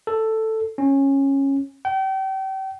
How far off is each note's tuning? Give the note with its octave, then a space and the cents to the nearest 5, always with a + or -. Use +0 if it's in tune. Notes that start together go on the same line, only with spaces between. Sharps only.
A4 +5
C#4 -15
G5 -35